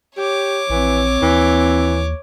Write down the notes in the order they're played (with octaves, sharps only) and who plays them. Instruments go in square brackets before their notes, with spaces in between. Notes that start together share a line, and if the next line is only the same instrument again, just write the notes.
[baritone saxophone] G4 [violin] C#5 D6
[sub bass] A#1 [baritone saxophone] E3 [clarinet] C4
[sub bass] D#2 [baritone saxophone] E3